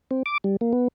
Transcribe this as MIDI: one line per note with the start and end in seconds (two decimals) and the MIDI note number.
0.11 0.23 60
0.26 0.38 86
0.44 0.56 55
0.61 0.73 58
0.73 0.88 59